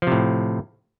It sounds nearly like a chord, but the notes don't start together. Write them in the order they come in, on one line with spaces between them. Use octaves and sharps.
F3 C3 A2